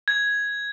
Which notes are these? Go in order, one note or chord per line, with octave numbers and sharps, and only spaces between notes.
G#6